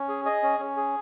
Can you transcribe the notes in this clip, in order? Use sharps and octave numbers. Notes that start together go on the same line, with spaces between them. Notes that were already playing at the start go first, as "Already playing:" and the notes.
Already playing: C#4
G#4
G#4 D#5
C#4
C#4
G#4